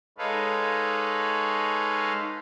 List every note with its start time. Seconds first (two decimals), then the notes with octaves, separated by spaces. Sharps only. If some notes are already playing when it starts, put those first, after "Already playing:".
0.18 G#3 D#4 A4 B4 C#5 F5